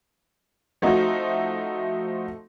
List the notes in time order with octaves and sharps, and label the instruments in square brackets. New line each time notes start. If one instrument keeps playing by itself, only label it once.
[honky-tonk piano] F3 A3 C4 D#4 F#4